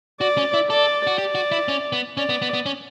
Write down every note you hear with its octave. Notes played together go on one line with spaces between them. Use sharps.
F#4 D5
C#4
E4
A4 D5
F#4
G4 D5
F#4
E4
C#4
B3
C#4 D5
B3
B3
B3
C#4